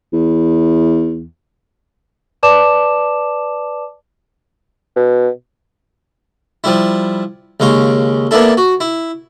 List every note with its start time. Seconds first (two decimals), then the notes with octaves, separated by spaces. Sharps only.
0.13 E2
2.43 B4 D5 A5 D6 E7
4.96 B2
6.64 F3 G3 E4
7.60 D#2 C#3 G#3 F5
8.31 A#3 B3 D4 E4 A4
8.57 F#4
8.80 E4